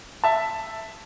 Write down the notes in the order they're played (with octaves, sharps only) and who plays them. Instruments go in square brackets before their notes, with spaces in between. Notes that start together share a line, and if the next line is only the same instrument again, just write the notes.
[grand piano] E5 A5